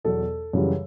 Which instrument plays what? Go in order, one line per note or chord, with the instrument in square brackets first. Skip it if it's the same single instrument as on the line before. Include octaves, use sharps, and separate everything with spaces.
[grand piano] E2 B2 F#3 A4
F#2 C#3 E3 G3